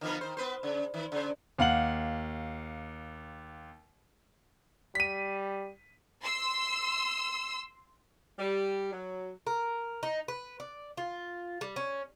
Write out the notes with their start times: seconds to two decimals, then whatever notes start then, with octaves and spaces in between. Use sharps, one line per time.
0.01 D3 F3 B3
0.21 D#3 C5
0.37 B3 B4 C5
0.63 C#3
0.94 D#3
1.12 C#3 C5
1.58 D#2 F5 F#5 F#7
4.95 G3 B6 D#7
6.23 C6 E6
8.38 G3
8.92 F#3
9.47 A#4
10.03 D#4
10.28 B4
10.60 D5
10.97 F4
11.61 G3
11.76 C#4